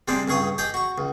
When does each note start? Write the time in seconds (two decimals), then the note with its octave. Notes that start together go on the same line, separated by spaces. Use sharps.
0.08 C3 G3 G#3 C4 D4
0.28 C#2 G2 G#4 C#6 D#6
0.58 G4 G#4 D#5 G5
0.74 F#4 C#6
0.98 C#2